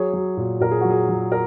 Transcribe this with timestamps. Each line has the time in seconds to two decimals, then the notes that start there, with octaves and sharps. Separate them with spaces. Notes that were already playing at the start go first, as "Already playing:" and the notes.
Already playing: F#3 G#4 C#5
0.13 F#3
0.37 A#2
0.60 A#2 A#4
0.71 G#4
0.81 F#3 F#4
0.91 G#4
1.09 F#3
1.32 A#4